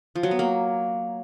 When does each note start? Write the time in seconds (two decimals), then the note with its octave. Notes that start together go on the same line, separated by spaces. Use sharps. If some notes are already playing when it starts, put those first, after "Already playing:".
0.15 F3
0.23 F#3
0.31 B3
0.39 A#3